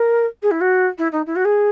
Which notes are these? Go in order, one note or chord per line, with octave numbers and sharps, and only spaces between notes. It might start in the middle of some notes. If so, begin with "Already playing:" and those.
Already playing: A#4
G#4
E4
F#4
E4
D#4
E4
F#4
G#4